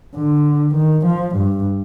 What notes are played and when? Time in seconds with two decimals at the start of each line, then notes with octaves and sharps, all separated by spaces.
0.16 D3
0.76 D#3
1.06 F3
1.36 G2